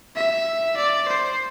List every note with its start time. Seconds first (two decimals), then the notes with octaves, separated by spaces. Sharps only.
0.16 E5
0.77 D5
1.09 C5